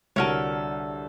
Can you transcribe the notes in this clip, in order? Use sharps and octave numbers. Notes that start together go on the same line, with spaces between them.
C2 D3 F#4 A4 A#4 C#5 E5 D#7